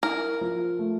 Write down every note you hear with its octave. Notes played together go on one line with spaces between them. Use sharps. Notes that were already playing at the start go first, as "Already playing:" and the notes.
E4 A#4
F3
A3